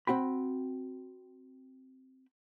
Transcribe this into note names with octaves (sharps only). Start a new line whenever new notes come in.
C4 F#4 G5 B5